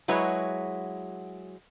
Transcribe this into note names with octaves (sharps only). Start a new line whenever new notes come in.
F#3 G#3 E4 F#4 B4 C#5